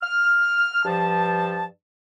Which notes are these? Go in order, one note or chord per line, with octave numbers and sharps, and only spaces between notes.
F6
G2 F3 A5